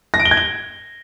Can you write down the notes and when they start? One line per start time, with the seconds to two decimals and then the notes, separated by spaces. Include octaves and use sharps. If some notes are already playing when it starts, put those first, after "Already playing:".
0.14 A#6
0.20 D7
0.25 G7
0.31 G#6
0.37 G7